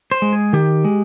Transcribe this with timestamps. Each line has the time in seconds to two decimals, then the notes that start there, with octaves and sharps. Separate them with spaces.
0.11 C5
0.22 G#3
0.33 G#4
0.53 D#3 G4
0.85 G#3